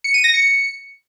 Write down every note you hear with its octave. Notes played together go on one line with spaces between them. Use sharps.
C#7
D#7
A#6
C#7